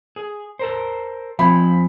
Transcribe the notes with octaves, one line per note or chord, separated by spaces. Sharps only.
G#4
A4 A#4 C5
F3 C4 G#5 B5